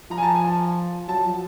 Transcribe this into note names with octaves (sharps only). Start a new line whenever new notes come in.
F3 A#5
G#5
A5
G#5
A5
F#3 A5
F3